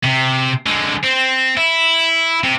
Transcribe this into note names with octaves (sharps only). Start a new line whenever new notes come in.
C3
D3 G#3
C4
E4
C3